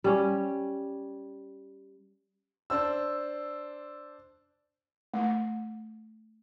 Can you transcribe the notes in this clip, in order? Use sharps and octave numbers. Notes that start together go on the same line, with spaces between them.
G3 C#4
D4 C5 E6
A3